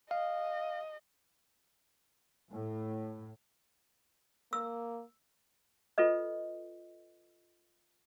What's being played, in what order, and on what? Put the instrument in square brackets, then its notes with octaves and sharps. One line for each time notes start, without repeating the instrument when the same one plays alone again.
[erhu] D#5 [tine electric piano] F5
[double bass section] A2
[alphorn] A#3 [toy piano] E6
[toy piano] F4 A4 B4 D#5